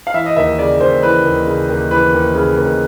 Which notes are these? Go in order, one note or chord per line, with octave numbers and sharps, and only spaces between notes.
F5
E3 E5
D#5
D#2 E5
C#3 D5
D#2 C5
E3 B4
D#2
C#3
D#2
E3 B4
D#2
C#3
D#2